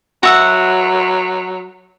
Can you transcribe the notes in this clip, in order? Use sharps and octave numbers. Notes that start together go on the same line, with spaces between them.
F#3 F#4 E5 F#5